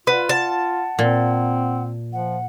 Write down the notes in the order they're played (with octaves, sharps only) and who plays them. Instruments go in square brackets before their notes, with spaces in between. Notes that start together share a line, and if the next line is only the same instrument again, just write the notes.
[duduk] F4 [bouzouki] B4 [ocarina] F#5
[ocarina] F#5 [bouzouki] A5
[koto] A#2 [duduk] C4
[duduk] F3 [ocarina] F#5